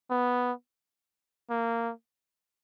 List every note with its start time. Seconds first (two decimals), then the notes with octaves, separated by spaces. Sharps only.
0.10 B3
1.50 A#3